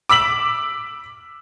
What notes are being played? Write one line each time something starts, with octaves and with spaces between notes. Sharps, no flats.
D6 E6 B6 F#7